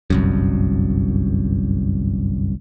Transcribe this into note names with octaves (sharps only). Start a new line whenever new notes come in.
G1 C2 F#2